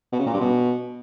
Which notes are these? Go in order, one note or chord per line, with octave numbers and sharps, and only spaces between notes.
B2
C#3
A#2
G2
B2